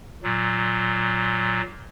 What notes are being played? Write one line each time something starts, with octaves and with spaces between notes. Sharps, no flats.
A#2 F#3